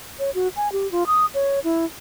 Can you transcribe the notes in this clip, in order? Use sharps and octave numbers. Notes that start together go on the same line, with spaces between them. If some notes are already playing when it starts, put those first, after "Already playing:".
C#5
F#4
G#5
G4
F4
D#6
C#5
E4